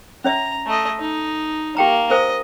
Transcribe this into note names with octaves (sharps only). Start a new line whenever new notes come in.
C#4 C#5 E5 A#5
A3 D#5
D#4
A#3 G4 G5 A#5
A#4 C5 D#5 G#5